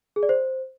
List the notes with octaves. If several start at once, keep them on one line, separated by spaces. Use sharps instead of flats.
G#4
D5
C5